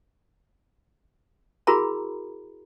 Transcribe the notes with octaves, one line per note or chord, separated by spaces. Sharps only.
E4 F#4 G#4 A#4 A#5 B5